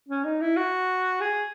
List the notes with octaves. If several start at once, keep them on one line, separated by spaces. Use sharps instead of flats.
C#4
D#4
E4
F#4
G#4